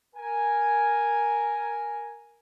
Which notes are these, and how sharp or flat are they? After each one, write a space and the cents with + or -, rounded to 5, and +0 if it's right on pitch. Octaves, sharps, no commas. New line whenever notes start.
A#4 +0 G#5 +0